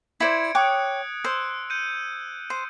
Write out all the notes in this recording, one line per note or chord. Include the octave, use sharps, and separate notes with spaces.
E4 C5 D5 G#6 C#7 D7
C#5 G5 D6 D#6 F#6
C5 E6
G6 C#7 D#7
C5